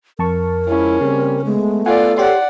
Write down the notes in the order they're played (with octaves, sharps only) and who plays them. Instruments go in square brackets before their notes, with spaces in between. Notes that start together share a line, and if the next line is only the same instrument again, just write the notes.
[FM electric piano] F2 A5 C#6 [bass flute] A#4
[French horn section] F3 G#3 E4 [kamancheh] C#4
[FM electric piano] C#3 [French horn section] G3 A#3 C4
[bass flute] G#3 [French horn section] A3 B3
[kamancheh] F4 D5 [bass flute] A4 [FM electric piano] F#5 G#5
[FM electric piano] G4 C#5 C6 [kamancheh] D5 F#5